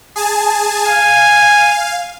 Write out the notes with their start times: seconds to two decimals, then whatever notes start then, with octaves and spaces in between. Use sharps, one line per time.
0.16 G#4 G#5 A5
0.85 F5 G#5